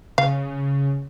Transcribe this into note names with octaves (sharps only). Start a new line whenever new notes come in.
C#3 F5